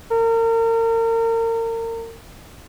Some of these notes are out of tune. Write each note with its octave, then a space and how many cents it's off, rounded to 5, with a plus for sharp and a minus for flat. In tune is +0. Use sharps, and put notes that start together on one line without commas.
A#4 -35